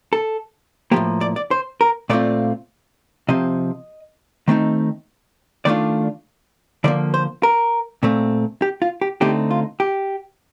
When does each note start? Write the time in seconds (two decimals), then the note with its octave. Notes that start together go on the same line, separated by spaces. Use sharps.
0.13 A4
0.91 A2 F3 A#3 G4
1.21 D5
1.36 D5
1.51 C5
1.81 A#4
2.10 A#2 A3 C4 F4 D5
3.29 C3 F3 C4 D#5
4.48 D#3 A3 C4 D#4
5.65 D#3 A3 D4 F4 D5
6.84 D3 F3 A#3 D5
7.14 C5
7.43 A#4
8.03 A#2 A3 C4
8.62 G4
8.82 F4
9.01 G4
9.21 D3 A3 C4 D#4 G4
9.50 F4
9.80 G4